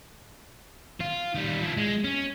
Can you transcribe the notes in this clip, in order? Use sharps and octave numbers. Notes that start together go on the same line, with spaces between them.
F4
D#3 G3
F3 E4
G#3
C#4